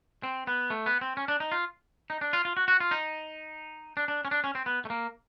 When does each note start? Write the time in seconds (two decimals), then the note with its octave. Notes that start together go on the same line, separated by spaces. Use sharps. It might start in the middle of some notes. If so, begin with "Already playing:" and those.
0.23 C4
0.47 B3
0.70 A3
0.86 B3
1.01 C4
1.17 C#4
1.28 D4
1.40 D#4
1.52 F4
2.10 D#4
2.21 D4
2.33 F4
2.45 F4
2.57 F#4
2.68 F#4
2.80 F4
2.91 D#4
3.97 D4
4.08 D4
4.25 C#4
4.31 D4
4.44 C#4
4.55 C4
4.66 B3
4.85 A3
4.90 A#3